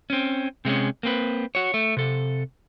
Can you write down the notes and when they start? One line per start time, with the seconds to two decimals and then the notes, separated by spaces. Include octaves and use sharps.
0.10 C4 C#4
0.65 C3 G#3 A3 C#4
1.03 A#3 C4 B4
1.55 F#4 C#5
1.74 A3
1.97 C3 A4